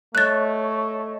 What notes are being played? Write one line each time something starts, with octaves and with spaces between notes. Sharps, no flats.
A3 C#5 D#5 C#6 F#6 A6